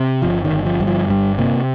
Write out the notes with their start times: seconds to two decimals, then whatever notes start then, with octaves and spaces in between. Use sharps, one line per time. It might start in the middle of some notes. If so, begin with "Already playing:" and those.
Already playing: C3
0.22 G1 F3
0.44 D#3
0.51 G1
0.66 F3
0.80 G2
0.87 F3
1.09 G1 G3
1.38 C3 A#3